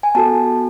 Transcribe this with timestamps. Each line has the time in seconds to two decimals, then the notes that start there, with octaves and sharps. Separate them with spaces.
0.03 G#5
0.15 B3 F#4 A4 A5